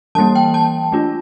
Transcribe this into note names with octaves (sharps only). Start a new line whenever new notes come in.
E3 G3 A#3 A5
G5
A5
A3 D4 F4